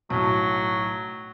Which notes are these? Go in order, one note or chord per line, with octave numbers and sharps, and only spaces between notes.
B1 A2 F#3